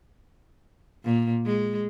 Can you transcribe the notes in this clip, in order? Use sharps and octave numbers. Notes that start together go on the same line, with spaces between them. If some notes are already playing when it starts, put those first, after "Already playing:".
A#2
G#3